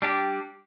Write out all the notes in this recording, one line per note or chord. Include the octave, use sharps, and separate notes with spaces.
G3 D4 G4